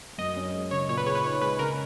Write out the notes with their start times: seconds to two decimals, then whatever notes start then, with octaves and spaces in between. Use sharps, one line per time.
0.18 F#2 D#5
0.36 C#4
0.54 G#3
0.71 C#3 C#5
0.89 A#2 C#5
0.97 B4
1.06 G#4 C#5
1.15 B4
1.24 D#4 C#5
1.41 G#3 B4
1.59 C#3 A#4